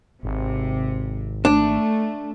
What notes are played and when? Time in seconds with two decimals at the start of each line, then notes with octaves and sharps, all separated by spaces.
0.23 G#1 C3
1.45 A3 D4